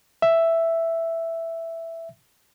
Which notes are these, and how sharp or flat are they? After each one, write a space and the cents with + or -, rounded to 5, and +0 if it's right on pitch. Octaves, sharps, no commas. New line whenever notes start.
E5 +5